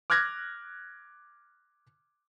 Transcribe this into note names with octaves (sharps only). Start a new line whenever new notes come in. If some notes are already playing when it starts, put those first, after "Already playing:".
D6 F6 F#6 G#6 A#6